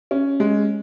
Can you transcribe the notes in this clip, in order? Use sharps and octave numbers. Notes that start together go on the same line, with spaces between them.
C#4
G#3